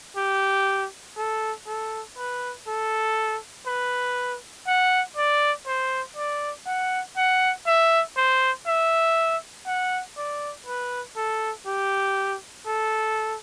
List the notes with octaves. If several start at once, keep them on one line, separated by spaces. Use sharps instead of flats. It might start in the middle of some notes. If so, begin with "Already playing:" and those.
G4
A4
A4
B4
A4
B4
F#5
D5
C5
D5
F#5
F#5
E5
C5
E5
F#5
D5
B4
A4
G4
A4